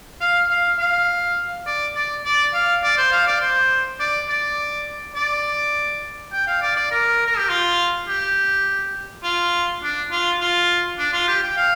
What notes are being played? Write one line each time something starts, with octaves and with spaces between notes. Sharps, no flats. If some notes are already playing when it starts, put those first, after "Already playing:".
F5
F5
F5
D5
D5
D5
F5
D5
C5
F5
D5
C5
D5
D5
D5
G5
F5
D5
D5
A#4
A#4
G4
F4
G4
F4
D4
F4
F4
D4
F4
G4
G5
F5